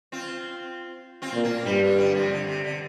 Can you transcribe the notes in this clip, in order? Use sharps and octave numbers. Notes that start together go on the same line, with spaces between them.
C4 F4
C4 F4
A#2
A#3 D4
G2 G3 C4
F3 A#3
D3 G3
C3 F3
D3
C3
D3